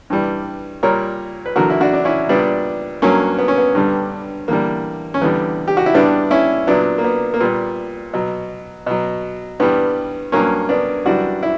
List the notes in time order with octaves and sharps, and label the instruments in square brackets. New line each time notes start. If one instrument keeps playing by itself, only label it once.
[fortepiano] G2 E3 G3
A#2 G3 A#4 C#5
B4
E2 D3 F#3 F#4 A#4
E4
D4 F#4
D4
C#4 E4
A#2 G3 B3 D4
G2 F#3 A#3 C#4
B3
C#4
B3
G2 D3 G3
E2 D3 G3 A#3
C#4
E2 D3 G3 B3
G4
F#4
E4
G2 E3 G3 B3 D4
C#4 E4
A#2 F#3 B3 D4
A#3
B3
A#3
A#2 G3 B3
B2 F#3
B2 F#3
G2 E3 G3 B3
G2 F#3 A#3 C#4
B3 D4
F#2 E3 G3 D4 F#4
E4